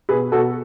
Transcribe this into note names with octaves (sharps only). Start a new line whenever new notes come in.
B2 G#4 B4
B2 F#4 A4